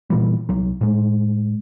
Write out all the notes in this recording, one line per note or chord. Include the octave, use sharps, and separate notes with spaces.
A#2 E3 G3
C2 F#3
A2 G#3